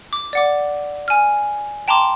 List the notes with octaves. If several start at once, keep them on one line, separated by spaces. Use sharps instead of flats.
D6
D5 F#5 D6
G#5 F6
G5 A5 A#5 C6 D6